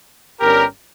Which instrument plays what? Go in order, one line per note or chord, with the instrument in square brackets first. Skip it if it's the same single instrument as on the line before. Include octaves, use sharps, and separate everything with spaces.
[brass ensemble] G1 G2 G3 C#4 G4 A#4